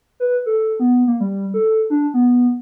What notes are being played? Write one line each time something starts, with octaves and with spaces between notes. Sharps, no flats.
B4
A4
B3
A#3
G3
A4
D4
B3